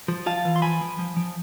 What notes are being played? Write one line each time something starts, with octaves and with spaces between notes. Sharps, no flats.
F3
F4 F5 A5
E3
C6
F3 G#5 B5
F3
F3
F3